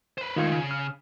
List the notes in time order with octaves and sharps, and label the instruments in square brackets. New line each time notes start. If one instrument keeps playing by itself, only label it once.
[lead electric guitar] B4 C5
[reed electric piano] D#3 F4 G#6 [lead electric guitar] G#3 A3
[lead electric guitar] C#3
[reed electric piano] F6